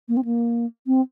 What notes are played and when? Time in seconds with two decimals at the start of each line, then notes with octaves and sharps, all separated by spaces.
0.08 A#3
0.17 C4
0.25 A#3
0.87 C4